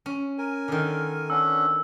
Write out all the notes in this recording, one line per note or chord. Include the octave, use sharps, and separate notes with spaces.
C#4
A#4 G#5
D3 D#3
B3 C#4 D4 E6